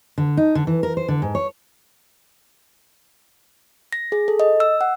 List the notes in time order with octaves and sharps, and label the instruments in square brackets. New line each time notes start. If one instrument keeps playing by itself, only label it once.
[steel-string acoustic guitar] D3
D#4
D3
E3
A#4
C5
D3
G#2
C#5
[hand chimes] A#6
G#4
A4
D#5
E6
F#5